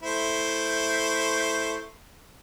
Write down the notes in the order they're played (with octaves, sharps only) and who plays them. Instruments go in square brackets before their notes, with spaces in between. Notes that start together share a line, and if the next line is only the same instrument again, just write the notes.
[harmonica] A3 E4 C5